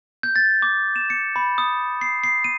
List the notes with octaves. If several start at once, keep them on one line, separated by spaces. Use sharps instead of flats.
G6
A6
D6
E7
C#7
B5
D#6
C7
C7
D#7